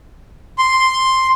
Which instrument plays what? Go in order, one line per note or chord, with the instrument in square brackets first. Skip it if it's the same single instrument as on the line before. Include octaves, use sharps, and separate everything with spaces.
[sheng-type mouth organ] C6